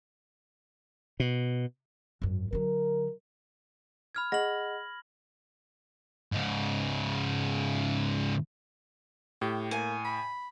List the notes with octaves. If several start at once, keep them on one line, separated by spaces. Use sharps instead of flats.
B2
G#1 F#2
D3 F#3 A#4
B5 F6 G#6
G#4 D#5 F#5 A#6 F#7
G#2 C#3
A2 G4
A#3 G#5
B5